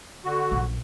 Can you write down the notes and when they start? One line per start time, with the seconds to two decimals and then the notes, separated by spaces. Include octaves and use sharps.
0.25 D3 F#4
0.51 A#1 F#2